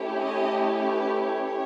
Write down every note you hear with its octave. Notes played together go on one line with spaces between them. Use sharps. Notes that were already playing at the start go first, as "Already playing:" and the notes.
Already playing: A3 C#4 E4 G4
D#5
B4
C#5